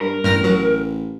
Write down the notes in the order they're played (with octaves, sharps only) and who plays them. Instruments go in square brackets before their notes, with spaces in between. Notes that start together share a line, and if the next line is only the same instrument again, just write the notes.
[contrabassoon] G2 [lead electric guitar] A#4
[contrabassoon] A1 [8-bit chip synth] G2 F6 A#6
[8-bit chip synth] F#3